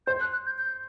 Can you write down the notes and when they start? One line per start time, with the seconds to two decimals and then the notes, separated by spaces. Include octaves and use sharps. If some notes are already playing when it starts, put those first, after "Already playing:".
0.07 C5 G6
0.20 F#6
0.32 F#6
0.46 G6
0.58 G6